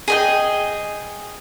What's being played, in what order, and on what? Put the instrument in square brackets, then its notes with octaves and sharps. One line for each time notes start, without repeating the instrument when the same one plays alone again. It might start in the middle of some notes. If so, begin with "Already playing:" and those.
[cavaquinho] G#4 D#5 G5